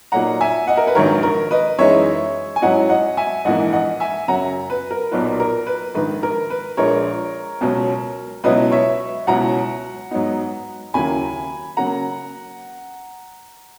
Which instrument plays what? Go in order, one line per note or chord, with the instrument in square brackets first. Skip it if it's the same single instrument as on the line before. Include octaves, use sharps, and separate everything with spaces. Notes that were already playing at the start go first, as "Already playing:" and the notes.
[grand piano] A#2 F#3 A#3 D#4 F#5 A#5
E5 G#5
D#5 F#5
A#4
B4
A#1 G#2 D#3 F#3 A#4 C#5
A#4
B4 D#5
F#2 E3 G#3 D#4 C#5 E5
G#5
G#2 F#3 C#4 E4 D#5 F#5
D#5 F#5
E5 G#5
A#1 G#2 E3 A#3 D#5 F#5
D#5 F#5
E5 G#5
F#2 C#3 F#3 F#5 A#5
B4
A#4
B1 A#2 F#3 B3 D#4 B4
A#4
B4
A#1 G#2 D#3 B4
A#4
B4
A#1 A#2 G#3 A#4 C#5
C#2 B2 F#3 C#4
C#2 B2 F#3 B3 E4 B4 D#5
C#5 E5
C#2 B2 F#3 C#4 E4 F#5 A#5
G#2 F#3 B3 D#4
D#2 C#3 F#3 A#3 E4 G#5 B5
C#3 F#3 A#3 F#5 A#5